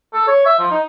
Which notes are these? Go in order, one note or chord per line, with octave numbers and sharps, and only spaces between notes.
A4
C#5
E5
F3
D#4